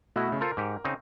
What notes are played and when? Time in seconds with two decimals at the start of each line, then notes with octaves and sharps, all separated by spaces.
0.16 B2 A3 E4 F#4 B4 D#5
0.29 C#3 A3
0.41 F4 A4 A#4 C5
0.57 G#2 G4
0.84 C#3 C4 D#4